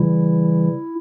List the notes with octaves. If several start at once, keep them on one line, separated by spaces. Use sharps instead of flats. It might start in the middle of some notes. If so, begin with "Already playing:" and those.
Already playing: C#3 E3 G3 E4